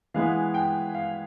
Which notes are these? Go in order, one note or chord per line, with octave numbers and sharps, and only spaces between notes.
E3 G#3 B3 F5
G5
F5